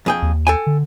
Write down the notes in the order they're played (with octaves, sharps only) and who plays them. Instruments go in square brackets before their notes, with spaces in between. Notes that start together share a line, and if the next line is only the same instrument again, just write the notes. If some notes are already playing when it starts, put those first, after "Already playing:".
[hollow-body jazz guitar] F2 G#4 G5
[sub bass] D#2
[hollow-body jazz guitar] A4 G5 G#5
[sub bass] D3